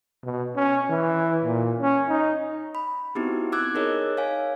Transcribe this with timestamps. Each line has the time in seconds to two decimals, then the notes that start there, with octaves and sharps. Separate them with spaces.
0.24 B2
0.56 C#4
0.89 E3
1.44 A#2
1.79 C#4
2.09 D#4
2.75 B5
3.15 B3 C4 D#4 E4 F#4 G4
3.52 D6 E6 F#6 G#6
3.74 D#4 G#4 A#4 C#5 D#5
4.17 C#5 F5 G#5